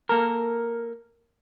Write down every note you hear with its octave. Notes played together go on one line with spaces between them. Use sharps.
A#3 A4 A#4